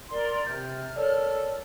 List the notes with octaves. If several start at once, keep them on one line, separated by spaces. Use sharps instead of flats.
A#4 D5 C6
C3 F6 G6 A6
A4 A#4 C#5 D5